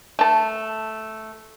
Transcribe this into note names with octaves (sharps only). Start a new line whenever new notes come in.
A3 A5